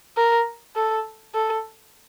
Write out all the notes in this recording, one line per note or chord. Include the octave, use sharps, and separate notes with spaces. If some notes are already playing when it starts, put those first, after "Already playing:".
A#4
A4
A4